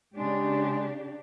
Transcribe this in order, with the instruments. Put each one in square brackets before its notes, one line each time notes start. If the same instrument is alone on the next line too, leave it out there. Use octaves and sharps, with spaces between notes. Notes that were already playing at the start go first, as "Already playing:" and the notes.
[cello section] C#3 D4 G4 [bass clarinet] G#3